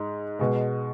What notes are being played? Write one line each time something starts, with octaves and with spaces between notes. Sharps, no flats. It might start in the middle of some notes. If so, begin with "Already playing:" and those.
Already playing: G#2 G#3
B2 G#3